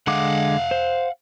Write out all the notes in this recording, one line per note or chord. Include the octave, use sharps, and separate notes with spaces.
D3 G#3 F5 F#5 D6
C5